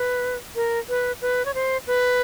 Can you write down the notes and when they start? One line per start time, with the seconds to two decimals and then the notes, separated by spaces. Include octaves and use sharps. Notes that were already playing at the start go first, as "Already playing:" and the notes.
Already playing: B4
0.56 A#4
0.89 B4
1.22 B4
1.46 C#5
1.54 C5
1.87 B4